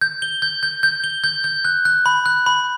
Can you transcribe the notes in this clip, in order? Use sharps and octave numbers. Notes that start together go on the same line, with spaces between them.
G6
G7
G6
G6
G6
G7
G6
G6
F#6
F#6
B5
F#6
B5